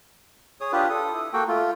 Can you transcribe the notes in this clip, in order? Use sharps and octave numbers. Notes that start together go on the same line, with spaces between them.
G#4 C#5 D#6
D4 F4 G4 B4
A4 D#6
E4
A#3 F#4 A4 G5
A3 F4